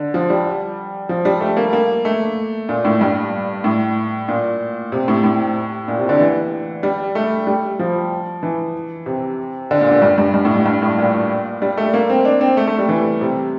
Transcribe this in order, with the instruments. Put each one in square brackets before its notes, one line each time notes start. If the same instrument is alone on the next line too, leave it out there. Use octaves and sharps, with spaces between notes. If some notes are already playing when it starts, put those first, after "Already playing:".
Already playing: [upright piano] D3
F3
G3
F3
G3
A3
A#3
A#3
A3
A#2
A2
G2
A2
A#2
C3
A2
A2
A#2
C3
D3
E3
G3
A3
G3
F3
E3
C3
D3
A#2
A#2
G2
G2
G2
A2
G2
G2
A2
A#2
G3
A3
A#3
C4
D4
C4
A3
A3
G3
E3
C3